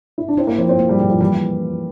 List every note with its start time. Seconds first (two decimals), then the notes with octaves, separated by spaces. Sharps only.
0.18 E4
0.28 D4
0.37 C4 E4
0.47 A#3
0.58 F3 C4
0.69 C4
0.79 A#3
0.89 G3
1.00 G3 A#3
1.10 F3
1.21 E3 G3